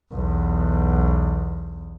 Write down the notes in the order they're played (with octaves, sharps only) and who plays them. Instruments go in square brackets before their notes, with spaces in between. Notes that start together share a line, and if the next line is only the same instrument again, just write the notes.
[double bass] B1 E2